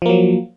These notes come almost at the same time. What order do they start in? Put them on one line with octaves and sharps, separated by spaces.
F3 A#3 F#3